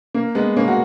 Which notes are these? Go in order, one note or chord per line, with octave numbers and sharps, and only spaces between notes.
A#3
G#3 B3
A#3 C#4
F#4